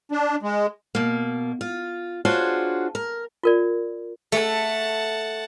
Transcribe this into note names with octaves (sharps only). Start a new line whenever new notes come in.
D4
G#3
B2 A#3
F4
D4 F4 F#4 G#4 C5 C#5
A#4
F4 A#4 D5
A3 F#5 A5